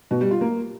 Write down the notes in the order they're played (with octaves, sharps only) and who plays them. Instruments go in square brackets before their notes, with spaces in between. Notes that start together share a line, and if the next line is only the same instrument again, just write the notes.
[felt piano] B2
G3
F4
A#3